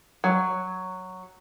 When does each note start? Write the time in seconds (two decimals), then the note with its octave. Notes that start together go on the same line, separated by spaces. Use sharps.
0.24 F#3